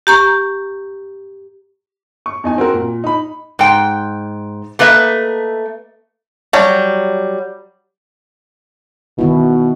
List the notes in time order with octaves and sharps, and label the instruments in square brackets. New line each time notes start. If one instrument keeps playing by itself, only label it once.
[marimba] G4 A#5 C#6
[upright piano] C#6
E2 D#4 G#5
C4 F#4 A#4
A#2
D#4 B5
[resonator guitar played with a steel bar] G#2 G5
A3 A#3 B4 D#5 E5
[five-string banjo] F#3 G3
[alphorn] B2 [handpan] D#3 B3 E4